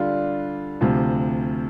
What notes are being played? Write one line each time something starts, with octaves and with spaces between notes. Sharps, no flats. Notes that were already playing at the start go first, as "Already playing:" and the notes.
Already playing: D3 G3 D4 F4
D2 C3 F3